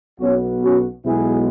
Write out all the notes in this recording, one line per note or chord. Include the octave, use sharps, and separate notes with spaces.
B1 B2 B3 C#4 F#4
C#4 F#4
B1 B2 G#3 B3 E4 G#4